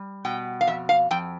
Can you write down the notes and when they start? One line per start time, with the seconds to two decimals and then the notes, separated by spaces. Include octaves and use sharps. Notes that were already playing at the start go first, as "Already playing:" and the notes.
Already playing: G3
0.25 B2 G5
0.61 F5
0.67 F2 E5
0.89 F5
1.11 F2 G5